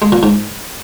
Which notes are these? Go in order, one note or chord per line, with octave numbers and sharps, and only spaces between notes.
G#3
A#2
G#2